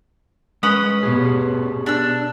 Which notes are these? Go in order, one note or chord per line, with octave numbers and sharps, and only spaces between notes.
G#3 C#4 B4 D#6
B2 B3 G4 G#4
D4 E6